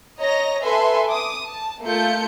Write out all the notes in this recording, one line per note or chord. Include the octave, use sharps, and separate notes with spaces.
C#5 D#5 A#5 A#6
A4 B4 E5 G#5 C6
D6 D#6
A5
A3 A#3 F4 A4 G6 C#7